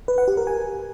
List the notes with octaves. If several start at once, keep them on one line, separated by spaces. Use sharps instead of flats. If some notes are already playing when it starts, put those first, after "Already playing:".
B4
F#5
G4
A#4
G#5